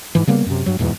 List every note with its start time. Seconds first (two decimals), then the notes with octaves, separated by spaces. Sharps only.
0.15 G#2 E3
0.27 C#3 G3 A#3 B3
0.46 F#2 C3
0.66 G2 F#3
0.79 D1 E2 G#2 B2